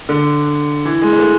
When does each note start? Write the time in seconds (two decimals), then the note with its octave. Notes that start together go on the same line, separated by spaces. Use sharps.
0.09 D3
0.85 E3
1.02 G#3
1.12 G#3
1.19 A3